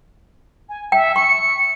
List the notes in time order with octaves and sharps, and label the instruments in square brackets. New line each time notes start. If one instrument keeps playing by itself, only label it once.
[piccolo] G#5
[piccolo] E5 [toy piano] G5
[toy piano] C#6 [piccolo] C#7